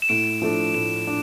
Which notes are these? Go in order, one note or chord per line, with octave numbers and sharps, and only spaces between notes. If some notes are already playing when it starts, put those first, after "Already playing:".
E7
A2 D7
F3 A3 D4
A2 E7
D4